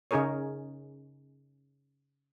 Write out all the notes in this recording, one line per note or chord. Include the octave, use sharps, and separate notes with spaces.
C#3 C#4 D#4 G#4 A#4 C#5